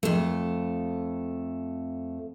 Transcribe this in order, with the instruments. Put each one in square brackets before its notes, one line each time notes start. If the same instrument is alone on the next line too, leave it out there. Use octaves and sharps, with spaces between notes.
[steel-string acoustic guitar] F2 A3